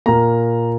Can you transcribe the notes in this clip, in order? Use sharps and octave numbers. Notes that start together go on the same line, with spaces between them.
A#2 A#3 A#5